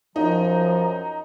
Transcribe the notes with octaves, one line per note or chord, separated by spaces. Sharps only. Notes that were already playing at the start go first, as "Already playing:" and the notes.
F#2 F3 D#4 A#5